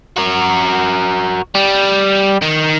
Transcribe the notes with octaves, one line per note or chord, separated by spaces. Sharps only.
F#4 A#4
G3
D#3